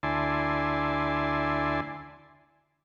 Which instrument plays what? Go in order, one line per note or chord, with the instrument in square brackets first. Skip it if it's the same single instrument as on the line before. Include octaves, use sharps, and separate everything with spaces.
[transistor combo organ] D2 E4 D5 G#5 A5 C6